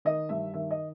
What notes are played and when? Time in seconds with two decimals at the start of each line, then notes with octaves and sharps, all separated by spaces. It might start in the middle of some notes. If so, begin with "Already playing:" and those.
0.05 D#3 D#5
0.29 G2 E5
0.54 D#3 E5
0.71 D#5